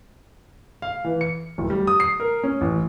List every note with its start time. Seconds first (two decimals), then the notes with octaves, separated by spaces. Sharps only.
0.82 F5
1.04 E3
1.21 C#7
1.58 D1
1.70 G3
1.87 D#6
2.00 C7
2.20 A#4
2.43 C#4
2.61 A1